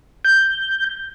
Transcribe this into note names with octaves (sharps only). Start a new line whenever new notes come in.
G6